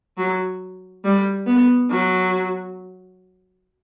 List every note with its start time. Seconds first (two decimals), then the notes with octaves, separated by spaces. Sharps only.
0.17 F#3
1.04 G3
1.47 B3
1.90 F#3